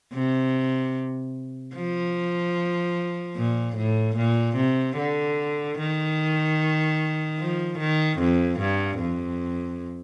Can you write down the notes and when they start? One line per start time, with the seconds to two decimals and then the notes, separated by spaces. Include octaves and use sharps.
0.14 C3
1.75 F3
3.36 A#2
3.76 A2
4.17 A#2
4.56 C3
4.97 D3
5.78 D#3
7.39 F3
7.79 D#3
8.19 F2
8.60 G2
9.00 F2